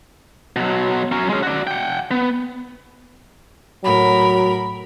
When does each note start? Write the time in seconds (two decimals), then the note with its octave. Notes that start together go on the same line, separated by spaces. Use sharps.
0.56 B2 F#3
1.12 F#3 C#4
1.29 G#3 C#4
1.43 F#4 D5
1.67 F#5 G5
2.11 B3
3.84 A2 F#3 A#4 B5